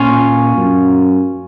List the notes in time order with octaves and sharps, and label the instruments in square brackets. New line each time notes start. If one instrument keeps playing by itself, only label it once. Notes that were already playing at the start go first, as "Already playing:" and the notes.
Already playing: [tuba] A#2 [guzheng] C#4 F4
[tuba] F#2